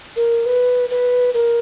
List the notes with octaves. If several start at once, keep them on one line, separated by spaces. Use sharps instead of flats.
A#4
B4
B4
A#4